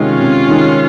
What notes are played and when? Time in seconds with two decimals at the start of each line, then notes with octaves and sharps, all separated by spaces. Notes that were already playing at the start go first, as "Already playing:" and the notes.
Already playing: C3 D#3 G#3 C#4 F4
0.19 C3
0.48 D#3 G#3